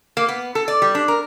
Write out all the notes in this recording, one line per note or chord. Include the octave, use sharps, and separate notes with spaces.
A#3
B3
A4
D5
G3
D4
A#4